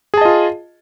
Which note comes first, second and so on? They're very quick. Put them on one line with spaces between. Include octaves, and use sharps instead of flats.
G#4 A5 D#5 F4